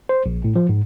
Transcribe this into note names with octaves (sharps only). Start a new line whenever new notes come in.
C5
A#1
A2
F3
G#2